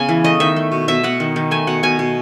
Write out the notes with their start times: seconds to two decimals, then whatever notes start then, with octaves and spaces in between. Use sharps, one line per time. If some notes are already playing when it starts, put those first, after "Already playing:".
Already playing: C#3 B3 G#5
0.09 E3
0.24 A3 D#5
0.40 D#3 E5
0.56 A3
0.72 B2
0.88 B2 E5
1.03 B2 F#5
1.20 D#3
1.36 D#3
1.51 A3 G#5
1.67 B2 F#5
1.83 B2 G#5
1.99 B2